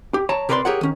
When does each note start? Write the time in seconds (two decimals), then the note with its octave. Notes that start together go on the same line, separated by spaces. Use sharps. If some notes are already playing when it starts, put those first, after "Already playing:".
0.14 G4
0.29 C#5 A5 A#5
0.49 C3 A#4 B4 C#5 D5 C6
0.65 G4 G#4 A#4 C#5 F#5
0.81 D#3 C#4